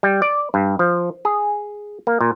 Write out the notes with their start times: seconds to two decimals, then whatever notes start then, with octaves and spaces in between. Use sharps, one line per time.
0.03 G3
0.22 D5
0.54 G2
0.79 F3
1.25 G#4
2.07 A#3
2.21 A#2